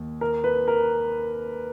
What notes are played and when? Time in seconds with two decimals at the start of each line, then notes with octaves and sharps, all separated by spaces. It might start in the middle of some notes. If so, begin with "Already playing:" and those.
Already playing: D#2
0.21 A#4
0.44 B4
0.68 A#4